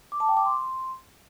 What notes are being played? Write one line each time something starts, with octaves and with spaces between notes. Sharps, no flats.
D6
A5
G5
D6
C6